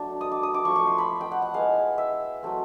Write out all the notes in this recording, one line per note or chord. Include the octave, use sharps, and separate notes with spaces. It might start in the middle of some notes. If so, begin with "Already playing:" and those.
Already playing: F#3 A3 D4
D#6
D6
D#6
D6
F3 A3 C4 C#6
C#6
C6
B5
G5
F#5
F#5
G#3 B3 E4 F5
E5
F#3 A3 C4